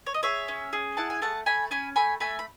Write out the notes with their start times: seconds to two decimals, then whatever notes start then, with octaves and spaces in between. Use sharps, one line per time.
0.07 C#5
0.14 D#5
0.23 G#4 C#5 E5
0.48 C#4
0.73 G#4
0.97 E4 F#5 A5
1.10 G#5
1.22 A3 F#5 A5
1.46 A3 G#5 B5
1.71 C#4 G#5 B5
1.96 A3 G#5 B5
2.20 A3 G#5 B5
2.39 B5